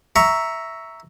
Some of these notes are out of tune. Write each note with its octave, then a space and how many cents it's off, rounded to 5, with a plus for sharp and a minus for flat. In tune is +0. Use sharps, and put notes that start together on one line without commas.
E5 -5 A#5 +0 C#6 +10